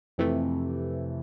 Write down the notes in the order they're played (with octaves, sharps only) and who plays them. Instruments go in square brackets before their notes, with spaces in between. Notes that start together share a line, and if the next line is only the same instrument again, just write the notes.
[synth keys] F2 C3 E3 A3